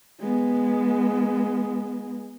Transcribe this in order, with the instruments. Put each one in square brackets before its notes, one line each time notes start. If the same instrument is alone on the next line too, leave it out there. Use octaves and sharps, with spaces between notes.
[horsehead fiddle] G#3 B3